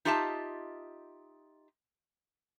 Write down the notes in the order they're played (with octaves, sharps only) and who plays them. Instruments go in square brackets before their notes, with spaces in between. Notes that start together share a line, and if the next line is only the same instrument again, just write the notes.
[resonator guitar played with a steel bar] D#4 F4 G4 D#5 E5 A5